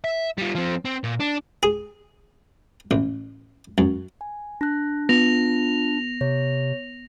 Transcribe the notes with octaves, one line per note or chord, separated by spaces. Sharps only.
E5
G3 F4
F3 C4
C4
A#2
D4
G#4
A1
F#2
G#5
D4 F#6 A#6
B3 F4 A#6 F7
C3 C#5